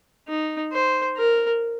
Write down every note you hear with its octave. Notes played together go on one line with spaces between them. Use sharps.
D#4
C5
A#4